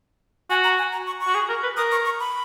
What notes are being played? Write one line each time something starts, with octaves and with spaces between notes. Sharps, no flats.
F#4 G#5
A#5
G#5
A#5
C#6
C#6
F#4
G#4
A#4
B4
A#4 D#6
C#6
C#6
B5